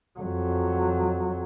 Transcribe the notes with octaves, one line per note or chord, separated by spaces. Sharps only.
F2 F#3